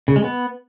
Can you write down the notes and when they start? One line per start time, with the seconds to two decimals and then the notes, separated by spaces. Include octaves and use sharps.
0.08 C#3
0.16 G#3
0.24 B3